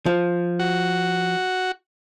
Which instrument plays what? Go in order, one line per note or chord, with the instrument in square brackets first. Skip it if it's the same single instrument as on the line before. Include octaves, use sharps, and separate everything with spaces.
[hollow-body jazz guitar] F3
[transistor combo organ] F#4